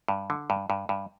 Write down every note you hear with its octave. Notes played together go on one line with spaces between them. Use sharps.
G2
D3
G2
G2
G2